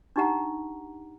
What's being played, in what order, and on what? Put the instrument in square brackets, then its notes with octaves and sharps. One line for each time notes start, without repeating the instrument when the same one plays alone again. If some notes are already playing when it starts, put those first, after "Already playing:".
[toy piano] D4 D#4 G4 F#5 A#5